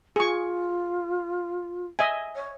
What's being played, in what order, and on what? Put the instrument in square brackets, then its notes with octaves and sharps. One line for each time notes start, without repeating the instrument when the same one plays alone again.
[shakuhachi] F4 [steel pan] G#4 C#6
[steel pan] D#5 E5 G#5
[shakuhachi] C#5